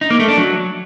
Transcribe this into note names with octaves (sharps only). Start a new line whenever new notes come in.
D#4
A#3
A3
D4
F#3